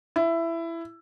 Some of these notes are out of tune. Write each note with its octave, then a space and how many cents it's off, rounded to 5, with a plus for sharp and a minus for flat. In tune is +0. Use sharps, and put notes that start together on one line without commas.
E4 +15